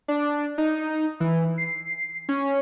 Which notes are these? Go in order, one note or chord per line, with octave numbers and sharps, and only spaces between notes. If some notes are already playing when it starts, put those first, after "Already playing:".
D4
D#4
E3
C7
C#4